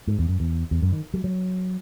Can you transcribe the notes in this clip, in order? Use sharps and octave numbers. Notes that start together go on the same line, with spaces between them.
G#2
E2
F#2
E2
E2
F#2
D#3
F#3
F#3